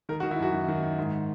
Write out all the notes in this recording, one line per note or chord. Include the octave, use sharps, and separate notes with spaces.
D#3 A#4
F#4
D#3
E4
F#2 F#4
D#3
D#3
D#3
G#2